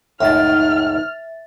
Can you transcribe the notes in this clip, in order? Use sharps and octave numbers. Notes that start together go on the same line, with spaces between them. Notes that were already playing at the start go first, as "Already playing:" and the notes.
C#2 F#2 A2 D#4 E5 F6 A6